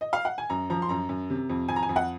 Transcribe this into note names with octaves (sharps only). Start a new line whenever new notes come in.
D#5
F5
F#5
G#5
F#2 A#5
F3 A#5
C6
F#2 A#5
F#2
C3
F2
F2 G#5
A#5
G#5
F2
F#5